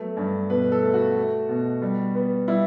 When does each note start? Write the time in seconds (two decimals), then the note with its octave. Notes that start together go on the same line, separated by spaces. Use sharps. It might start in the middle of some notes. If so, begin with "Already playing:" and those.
Already playing: F#3 A3 B3
0.17 G2
0.50 B2 B4
0.72 A4
0.83 A3
0.94 F#4
1.16 A3
1.49 B2
1.82 G3
2.15 B3
2.48 G3 E4